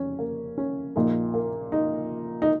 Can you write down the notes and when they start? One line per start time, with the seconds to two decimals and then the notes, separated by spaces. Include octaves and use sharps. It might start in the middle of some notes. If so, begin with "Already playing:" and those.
Already playing: F1 C#4
0.19 A#3
0.58 C#4
0.96 A#1 A#2 D#4
1.34 A#3
1.72 D#4
2.42 D#4